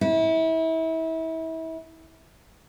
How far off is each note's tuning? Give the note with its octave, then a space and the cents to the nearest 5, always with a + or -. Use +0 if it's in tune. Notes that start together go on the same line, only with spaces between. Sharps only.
E4 -30